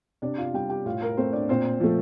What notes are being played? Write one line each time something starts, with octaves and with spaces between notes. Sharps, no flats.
C3 D4 D5
F4 F5
G3 G4 G5
G4 G5
A2 F4 F5
A#4
A3 C4 C5
D4 D5
A#2 C4 C5
F3 A3